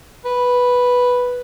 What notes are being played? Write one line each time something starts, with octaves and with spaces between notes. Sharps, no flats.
B4